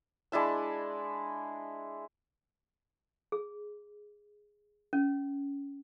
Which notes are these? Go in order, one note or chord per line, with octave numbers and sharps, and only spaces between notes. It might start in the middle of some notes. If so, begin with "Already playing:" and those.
G#3 D4 E4 A5
G#4
C#4